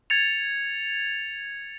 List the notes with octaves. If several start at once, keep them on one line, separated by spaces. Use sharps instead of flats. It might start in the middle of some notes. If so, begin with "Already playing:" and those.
G#6 A6 C#7 F7